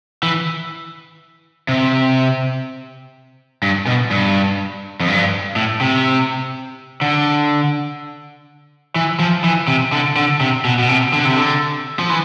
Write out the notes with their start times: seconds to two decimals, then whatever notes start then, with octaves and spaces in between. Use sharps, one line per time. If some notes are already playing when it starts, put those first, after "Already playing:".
0.23 E3
1.68 C3
3.63 G2
3.87 B2
4.11 G2
5.00 F2
5.08 G2
5.56 A2
5.81 C3
7.01 D3
8.96 E3
9.20 F3
9.44 E3
9.68 C3
9.92 D3
10.16 D3
10.41 C3
10.65 B2
10.79 B2
10.89 C3
11.13 D3
11.25 C3
11.37 D3
11.99 F3
12.10 E3